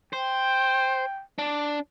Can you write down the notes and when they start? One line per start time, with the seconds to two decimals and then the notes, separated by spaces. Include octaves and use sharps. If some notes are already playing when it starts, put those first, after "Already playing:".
0.13 C5 G5
1.39 D4